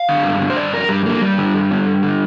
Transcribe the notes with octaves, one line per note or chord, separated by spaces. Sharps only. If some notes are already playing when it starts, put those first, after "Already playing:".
Already playing: F5
D3
G2
D3
C5
G2 D5
D3 A#4
G2 G3
D3 A#3
G2 G3
D3
G2
D3
G2
D3